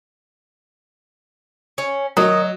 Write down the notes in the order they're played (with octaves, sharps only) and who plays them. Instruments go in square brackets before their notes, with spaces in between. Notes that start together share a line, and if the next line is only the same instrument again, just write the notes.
[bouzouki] C#4
[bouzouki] D#3 D#5 [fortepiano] F#3